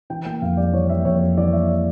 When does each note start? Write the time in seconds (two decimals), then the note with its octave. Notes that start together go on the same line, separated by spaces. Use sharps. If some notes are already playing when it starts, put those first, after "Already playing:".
0.10 E3 G5
0.25 A#3 G5
0.42 F2 F5
0.57 G3 D5
0.73 E3 C#5
0.89 A#3 E5
1.05 F2 C#5
1.21 G3
1.37 E3 D5
1.53 A#3 E5
1.68 D5